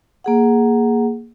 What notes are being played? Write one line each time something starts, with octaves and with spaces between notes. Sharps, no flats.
A#3 G#4 F#5